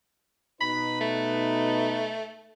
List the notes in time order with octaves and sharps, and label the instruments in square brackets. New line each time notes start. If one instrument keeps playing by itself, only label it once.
[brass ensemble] B2 D#4 B4 [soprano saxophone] B5
[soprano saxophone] A3